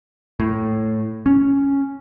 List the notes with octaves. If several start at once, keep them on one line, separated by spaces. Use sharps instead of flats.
A2
C#4